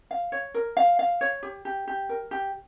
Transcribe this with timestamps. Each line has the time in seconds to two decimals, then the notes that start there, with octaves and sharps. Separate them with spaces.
0.11 F5
0.32 C#5
0.54 A#4
0.77 F5
0.99 F5
1.21 C#5
1.43 G4
1.65 G4
1.88 G4
2.09 A#4
2.31 G4